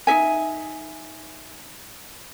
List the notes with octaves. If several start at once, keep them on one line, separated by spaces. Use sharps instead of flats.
D#4 G#4 E5 G#5